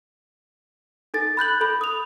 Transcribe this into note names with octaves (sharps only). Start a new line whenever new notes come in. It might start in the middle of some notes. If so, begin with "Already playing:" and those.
D#4 A4 A6
B5 F#6 G6 F#7
A4 B5
D#6 F7